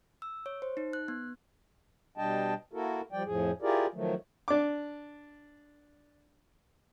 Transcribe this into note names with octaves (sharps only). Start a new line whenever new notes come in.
E6
C#5
C5
D#4
F#6
B3
B2 G3 D4 D#5 G5 A5
A#3 E4 F#4 A4 A#4
F3 G3 D5 G5
F2 A2 F3 G#4
E4 F4 G4 G#4 A#4 D5
D#3 F3 F#3 A3
D4 D6